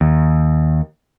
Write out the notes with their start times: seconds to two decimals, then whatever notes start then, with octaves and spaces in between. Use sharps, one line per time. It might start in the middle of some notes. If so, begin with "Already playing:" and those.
0.01 D#2